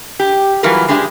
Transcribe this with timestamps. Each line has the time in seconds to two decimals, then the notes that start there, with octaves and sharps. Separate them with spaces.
0.20 G4
0.63 E3 F#3 G3 F4 A#4 B4
0.88 G#3 D4 G4 G#4 E5